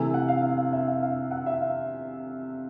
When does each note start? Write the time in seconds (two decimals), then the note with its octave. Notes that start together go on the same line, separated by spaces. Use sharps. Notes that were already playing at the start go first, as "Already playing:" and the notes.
Already playing: C3 E3 A3 G#5
0.14 F#5
0.28 F5
0.42 F5
0.57 F5
0.72 E5
0.87 F5
1.02 F5
1.31 F#5
1.46 E5
1.61 F5